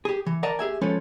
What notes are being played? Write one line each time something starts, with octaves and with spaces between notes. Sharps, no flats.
G4 G#4
E3
A#4 D5 D#5 F#5 A5 A#5
G4 G#4 E5 G#5
F3 G#3 C#4 F4 A4 B4